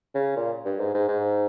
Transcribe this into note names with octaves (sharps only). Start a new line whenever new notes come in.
C#3
A#2
G2
G#2
G#2
G#2